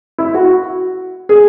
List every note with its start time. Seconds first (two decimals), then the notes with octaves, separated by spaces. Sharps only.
0.18 E4
0.34 F#4
1.29 G#4